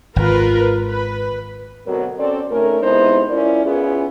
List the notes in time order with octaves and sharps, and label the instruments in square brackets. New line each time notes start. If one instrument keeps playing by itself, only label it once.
[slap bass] G#1 [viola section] F4 A#4 B4
[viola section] B4
[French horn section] D2 B2 F#3 C4 A#4
C4 C#4 F#4 A4 D5
C#3 A3 C#4 D#4 A#4
C3 G#3 B3 D#4 E4 C5
C#4 E4 F4 A#4 C#5 D5
B3 C#4 E4 F4 G#4